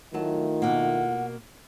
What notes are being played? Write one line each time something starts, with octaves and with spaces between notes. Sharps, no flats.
D#3 F#3 A3 E4 F4 A5
B2 A#3 F#5